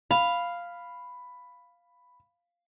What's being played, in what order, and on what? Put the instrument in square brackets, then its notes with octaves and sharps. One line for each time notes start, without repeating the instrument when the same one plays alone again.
[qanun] F5 [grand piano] B5